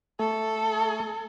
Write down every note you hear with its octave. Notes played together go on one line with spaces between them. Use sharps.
A3 A4